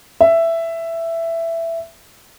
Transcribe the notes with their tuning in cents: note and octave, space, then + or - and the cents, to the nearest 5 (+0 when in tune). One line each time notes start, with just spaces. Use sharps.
E5 +10